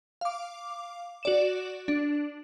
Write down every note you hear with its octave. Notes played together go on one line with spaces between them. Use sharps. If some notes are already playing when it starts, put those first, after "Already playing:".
F5 D6
F#4 D5 E7
D4